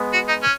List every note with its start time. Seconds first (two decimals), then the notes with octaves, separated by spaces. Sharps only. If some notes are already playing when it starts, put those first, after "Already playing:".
Already playing: G#3 B3
0.13 F#4
0.29 D#4
0.43 C#4